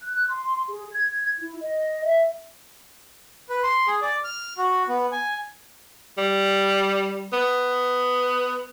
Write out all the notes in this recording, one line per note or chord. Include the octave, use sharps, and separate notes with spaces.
F#6
C6
G#4
G#6
E4
D#5
E5
B4
C6
G#4
D5
F6
F#4
B3
G#5
G3
B3